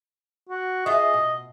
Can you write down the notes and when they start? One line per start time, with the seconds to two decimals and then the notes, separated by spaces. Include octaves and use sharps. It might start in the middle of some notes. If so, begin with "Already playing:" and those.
0.50 F#4
0.86 F4 G#4 D#5 E5
1.14 B2